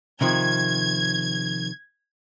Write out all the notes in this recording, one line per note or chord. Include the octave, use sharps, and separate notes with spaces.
C3 D#3 F3 G#6